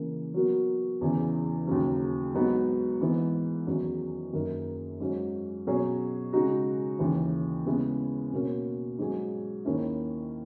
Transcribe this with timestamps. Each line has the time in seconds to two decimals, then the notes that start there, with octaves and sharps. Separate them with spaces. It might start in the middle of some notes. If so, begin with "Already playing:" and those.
Already playing: C#3 E3 A#3
0.34 F#3 B3 F#4 A#4
1.01 E2 C#3 E3
1.67 D#2 C#3 F#3
2.34 G#2 F#3 B3 D#4 F#4
3.01 G#2 E3 B3 E4 B4
3.67 E2 D#3 F#3 C#4
4.33 F#2 D#3 A#3 D#4 A#4
5.00 G#2 F#3 C#4
5.67 B2 F#3 C#4 G#4 C#5
6.33 C#3 G#3 D#4 F#4
6.99 D#2 C#3 E3
7.66 C#3 G#3 B3 E4
8.32 B2 A#3 C#4
8.99 G#2 F#3 C#4 G#4
9.65 D#2 D#3 A#3 C#4 E4